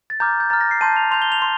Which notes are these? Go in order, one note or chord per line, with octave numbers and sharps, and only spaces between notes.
A6
A#5 D6 F6 G6
G6
A#5 F6 A6
A#6
C7
A5 C6 G6 D#7
F7
C6 G6 F7
G7
F7
C6